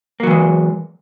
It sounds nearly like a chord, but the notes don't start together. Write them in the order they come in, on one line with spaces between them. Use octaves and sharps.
A#3 F#3 E3 G#3